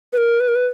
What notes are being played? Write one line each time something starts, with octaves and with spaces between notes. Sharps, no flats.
B4
A#4
B4
A#4
B4